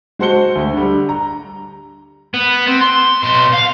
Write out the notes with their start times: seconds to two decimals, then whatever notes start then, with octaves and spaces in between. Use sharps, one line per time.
0.19 G#3 F#4 C5 A5 C#7 G7
0.56 D2
0.73 D3 G3
1.09 A#5
2.34 B3
2.67 C4
2.81 C6
3.24 B2 C6
3.54 F5